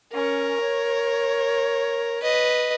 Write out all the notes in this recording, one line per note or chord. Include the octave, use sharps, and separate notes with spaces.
C#4 A#4 C#6
C#5
B4 D#5